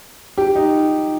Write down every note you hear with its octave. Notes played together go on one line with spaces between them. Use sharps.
G4
D#4